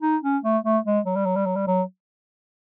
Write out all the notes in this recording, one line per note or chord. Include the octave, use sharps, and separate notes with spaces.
D#4
C#4
A3
A3
G#3
F#3
G3
F#3
G3
F#3
G3
F#3